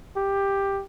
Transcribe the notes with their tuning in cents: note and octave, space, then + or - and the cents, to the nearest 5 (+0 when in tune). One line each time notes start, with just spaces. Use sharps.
G4 +10